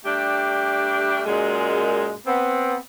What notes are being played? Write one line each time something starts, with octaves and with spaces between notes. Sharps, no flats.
G3 A3 D4 G4
F#2 A#2 G#3
B3 C4